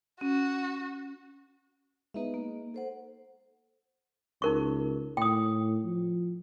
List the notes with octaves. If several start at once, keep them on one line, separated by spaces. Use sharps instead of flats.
C#4 F#4
G#3 B3 D#4 B4 E5
A#3
A4 C5 F#5
C#2 D#4 A#4 C#6
A2 G5 D#6
F3